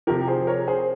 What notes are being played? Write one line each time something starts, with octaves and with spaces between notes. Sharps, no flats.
C3 F3 G4 A#4
G#4 C5
A#4 C#5
G#4 C5